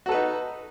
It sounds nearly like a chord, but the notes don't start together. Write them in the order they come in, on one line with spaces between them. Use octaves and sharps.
F#4 A4 B4 D#4